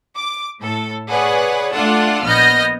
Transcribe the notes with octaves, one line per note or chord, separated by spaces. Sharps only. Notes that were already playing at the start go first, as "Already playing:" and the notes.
D6
A2 A4
G#4 B4 C#5 D5 F#5
A3 D4 F4 A4 F#5
A#1 B3 D#5 F6 G6 A#6